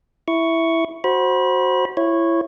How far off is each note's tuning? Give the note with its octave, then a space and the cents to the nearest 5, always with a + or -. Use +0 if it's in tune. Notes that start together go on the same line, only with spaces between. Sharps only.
E4 +0 C#6 +5
F#4 +0 C5 +10 B5 -30
E4 +25 C#5 -15